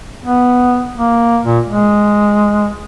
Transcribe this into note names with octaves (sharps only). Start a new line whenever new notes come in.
B3
A#3
A#2
G#3